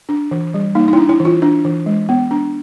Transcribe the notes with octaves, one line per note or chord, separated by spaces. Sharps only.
D4
E3
G3
A#3 D#4
D#4
D4 E4
E4
E3
F4
D4
E3
G#3
B3
D4